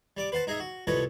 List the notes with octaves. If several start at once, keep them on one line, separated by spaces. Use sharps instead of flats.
G3 D5 D6
B4 C5 F#5 A5
D#4 G#4 D#5 E5 A#5
F#4
C2 F3 A4 B4 C#5 D#5